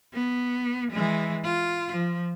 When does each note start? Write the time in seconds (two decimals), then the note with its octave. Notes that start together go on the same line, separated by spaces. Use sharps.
0.13 B3
0.92 E3 G#3
1.44 F4
1.92 F3